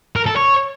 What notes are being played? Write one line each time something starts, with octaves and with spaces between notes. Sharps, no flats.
A#4
A4
C#5